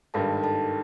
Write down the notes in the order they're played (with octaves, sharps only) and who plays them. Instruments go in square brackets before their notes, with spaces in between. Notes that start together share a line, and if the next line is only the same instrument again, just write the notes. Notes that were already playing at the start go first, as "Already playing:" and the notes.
[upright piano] G#1 G2 D#3 [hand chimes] A4 A5
[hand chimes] A4 A5